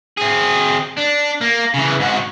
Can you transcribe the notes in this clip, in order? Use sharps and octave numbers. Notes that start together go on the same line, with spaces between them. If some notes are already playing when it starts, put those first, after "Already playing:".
C4 G#4
D4
A#3
C#3 E3
G#2 F#4